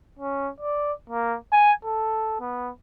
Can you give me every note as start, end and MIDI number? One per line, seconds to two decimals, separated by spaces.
0.19 0.50 61
0.60 0.93 74
1.10 1.36 58
1.52 1.72 80
1.85 2.39 69
2.40 2.70 59